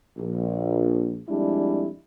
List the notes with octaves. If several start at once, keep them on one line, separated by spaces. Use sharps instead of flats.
A#1
F2 G3 G#3 D4 E4